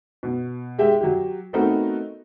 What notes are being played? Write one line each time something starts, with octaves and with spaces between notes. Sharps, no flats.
B2
G#3 G4 E5 G5
F#3 G4
A3 B3 C4 D#4 F#4 A#4